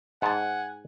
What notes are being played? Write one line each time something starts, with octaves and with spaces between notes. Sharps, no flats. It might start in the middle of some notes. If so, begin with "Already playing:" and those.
G#2 F#5 G#5 A5